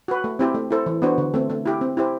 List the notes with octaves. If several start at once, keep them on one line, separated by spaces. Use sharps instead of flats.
F#4 B4
A3
C4 E4 G4 C5
A3
E4 A4 C5
E3
B3 D4 F#4 C5
D3
A3 C4
A3
E4 G4
C4
E4 G4 C5